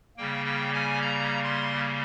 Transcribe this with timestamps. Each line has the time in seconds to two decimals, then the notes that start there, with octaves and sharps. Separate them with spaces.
0.17 C#3 G3 A#3 G5
0.45 G5
0.74 G#5
1.01 A#5
1.44 C6